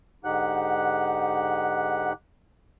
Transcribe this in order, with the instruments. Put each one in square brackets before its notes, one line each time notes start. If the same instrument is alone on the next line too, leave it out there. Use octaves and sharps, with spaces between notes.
[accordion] G#2 D3 D#4 G4 F#5 F#6